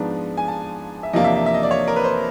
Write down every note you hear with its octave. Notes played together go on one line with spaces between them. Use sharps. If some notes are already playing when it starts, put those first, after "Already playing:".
Already playing: G#2 F3 G#3 B3 D4 A#5
G#5
A5
E5
E2 C3 F3 A#3 D4 D#5
E5
E5
E5
D#5
D5
C#5
A#4
B4
C5